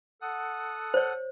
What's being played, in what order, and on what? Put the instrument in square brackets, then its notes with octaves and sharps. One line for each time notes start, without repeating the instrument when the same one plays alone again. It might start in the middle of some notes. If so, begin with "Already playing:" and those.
[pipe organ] A4 F#5 D#6
[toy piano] C5 C#5